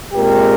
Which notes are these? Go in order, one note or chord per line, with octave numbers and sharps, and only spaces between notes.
A#2 G#3 C4 G4 A#4